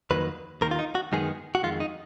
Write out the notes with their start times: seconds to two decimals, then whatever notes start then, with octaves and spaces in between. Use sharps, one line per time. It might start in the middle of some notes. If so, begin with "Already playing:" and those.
0.11 F2 D#3 F#3 A#3 B4
0.61 D#2 D#3 A#3 A#4
0.71 F4
0.79 D#4
0.95 F#4
1.12 F#2 D#3 G#3 B3 G#4
1.55 F#4
1.63 F2 D#3 G#3 F4
1.80 D#4